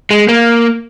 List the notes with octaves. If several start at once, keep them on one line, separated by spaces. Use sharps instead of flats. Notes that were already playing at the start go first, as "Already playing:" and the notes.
G#3
A#3